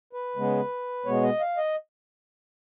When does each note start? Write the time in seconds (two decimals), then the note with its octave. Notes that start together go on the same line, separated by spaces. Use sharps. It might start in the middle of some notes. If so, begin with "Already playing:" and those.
0.13 B4
0.36 C#3 G#3 B3
1.05 B2 G#3 B3 C#5
1.23 D#5
1.40 F5
1.57 D#5